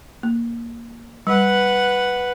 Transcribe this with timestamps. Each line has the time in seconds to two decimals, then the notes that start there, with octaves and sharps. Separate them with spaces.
0.23 A#3
1.27 G3 B4 F#5